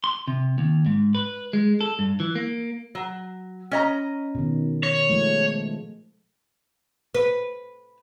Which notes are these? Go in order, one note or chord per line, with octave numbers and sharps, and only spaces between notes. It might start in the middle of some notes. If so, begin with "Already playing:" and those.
C6
C3
D#2
G#2
B4
G#3
A4
G2
E3
A#3
F#3
C#4 D#5 A#5
B2 D#3
C#5
F3 G#3 A3
B4